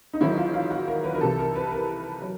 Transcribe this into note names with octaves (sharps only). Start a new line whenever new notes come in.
D#4
A1 G#2 D#3 F#3 E4
F4
F4
F#4
A#4
B4
A#4
C2 C3 E3 A4
A#4
B4
A#4
F#3